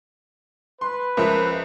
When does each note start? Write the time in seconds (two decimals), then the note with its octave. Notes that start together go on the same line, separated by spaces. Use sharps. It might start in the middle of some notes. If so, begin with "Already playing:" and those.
0.81 B4 C6
1.17 C#2 F3 A#4 E5